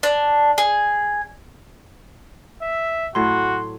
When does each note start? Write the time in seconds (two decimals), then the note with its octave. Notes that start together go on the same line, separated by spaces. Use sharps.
0.03 D4
0.58 G#4
2.62 E5
3.15 A2 F#3 F#4 C6